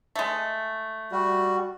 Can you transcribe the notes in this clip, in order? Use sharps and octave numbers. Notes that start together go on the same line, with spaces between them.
G#3 A3
G3 F#4